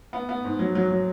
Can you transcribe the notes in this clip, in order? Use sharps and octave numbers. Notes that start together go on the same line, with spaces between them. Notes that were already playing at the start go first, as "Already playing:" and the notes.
B3
B3
G#2
F#3
F#3
F#3